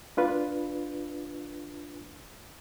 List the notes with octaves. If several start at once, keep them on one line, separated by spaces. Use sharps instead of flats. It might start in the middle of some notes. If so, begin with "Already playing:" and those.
D4 F4 B4